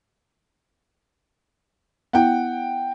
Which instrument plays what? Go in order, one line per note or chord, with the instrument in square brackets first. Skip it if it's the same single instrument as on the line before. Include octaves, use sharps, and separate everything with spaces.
[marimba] B3 E4 [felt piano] F#5 G5